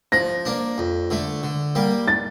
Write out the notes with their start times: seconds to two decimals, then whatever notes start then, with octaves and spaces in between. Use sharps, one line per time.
0.12 F3 A#6
0.45 A#3 D4
0.78 F2
1.10 D3 A3
1.43 D3
1.75 G3 A#3
2.08 A6